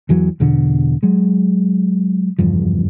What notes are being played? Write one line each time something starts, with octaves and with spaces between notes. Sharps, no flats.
E2 E3 F#3
E2 B2 D3
F#3 G#3
F#1 E2 G2 F3